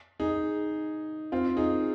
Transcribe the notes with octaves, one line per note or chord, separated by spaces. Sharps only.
D#4 G#4
C4 F4
D#4 G#4